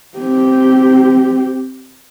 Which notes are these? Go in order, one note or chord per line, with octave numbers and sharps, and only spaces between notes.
C4 G4